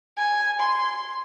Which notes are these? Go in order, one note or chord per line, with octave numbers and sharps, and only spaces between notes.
G#5
C6